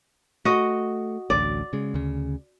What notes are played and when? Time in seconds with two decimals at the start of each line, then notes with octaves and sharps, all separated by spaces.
0.45 A3 F#4 D#5
1.30 A1 D2 D5
1.73 C#3 G#3
1.94 D2 C#3